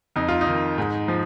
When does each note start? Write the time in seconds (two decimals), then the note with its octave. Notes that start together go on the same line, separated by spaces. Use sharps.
0.16 F2 D#4
0.28 F4
0.41 D#4
0.47 D#3
0.78 G#2
1.08 F3